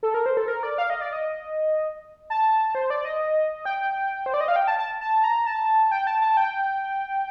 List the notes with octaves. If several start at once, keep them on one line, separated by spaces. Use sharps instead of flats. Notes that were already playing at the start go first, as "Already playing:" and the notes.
A4
A#4
C5
A4
A#4
D5
F5
D#5
D5
D#5
A5
C5
D5
D#5
G5
C5
D5
D#5
F5
G5
A5
A5
A5
A#5
A5
G5
A5
A5
G5